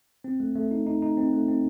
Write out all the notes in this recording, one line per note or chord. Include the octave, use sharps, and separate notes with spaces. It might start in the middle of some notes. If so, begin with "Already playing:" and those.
C4
A3
A3
D#4
D#4
D#4
C4
A3
C4